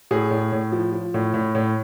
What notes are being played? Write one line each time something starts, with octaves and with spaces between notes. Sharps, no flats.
A2 G#4
A2
A2
F3
F3
A2
A2
A2